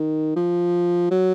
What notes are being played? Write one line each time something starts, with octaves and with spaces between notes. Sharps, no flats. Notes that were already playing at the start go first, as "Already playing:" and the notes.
Already playing: D#3
F3
F#3